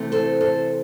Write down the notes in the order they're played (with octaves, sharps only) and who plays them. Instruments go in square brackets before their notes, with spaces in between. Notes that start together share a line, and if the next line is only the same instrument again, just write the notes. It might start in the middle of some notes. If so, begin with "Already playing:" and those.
Already playing: [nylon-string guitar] C3 E3 A3 C4
A4 C5
A4 C5